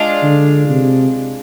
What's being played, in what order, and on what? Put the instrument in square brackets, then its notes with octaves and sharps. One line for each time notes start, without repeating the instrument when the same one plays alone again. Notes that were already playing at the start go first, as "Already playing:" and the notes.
Already playing: [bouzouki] G#3 D4 F4
[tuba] D3
C3